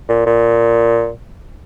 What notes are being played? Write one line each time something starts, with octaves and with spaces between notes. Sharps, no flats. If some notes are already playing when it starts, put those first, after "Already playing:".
A#2
A#2